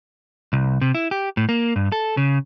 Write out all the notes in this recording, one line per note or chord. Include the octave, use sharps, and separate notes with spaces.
C2
C3
E4
G4
A2
A#3
G2
A4
C#3